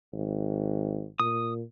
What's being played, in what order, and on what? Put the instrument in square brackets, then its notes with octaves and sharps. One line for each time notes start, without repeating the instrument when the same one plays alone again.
[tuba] G#1
[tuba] A#2 [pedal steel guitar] D#6